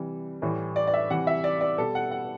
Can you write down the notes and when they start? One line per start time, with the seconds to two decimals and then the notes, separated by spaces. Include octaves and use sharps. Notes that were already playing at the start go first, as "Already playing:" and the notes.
Already playing: C3 E3 G3
0.42 A2 E3 G3
0.76 D5
0.87 D5
0.94 E5
1.10 C3 E3 G3 F#5
1.27 E5
1.44 D5
1.61 D5
1.78 B2 G3 A4
1.95 F#5
2.11 F#5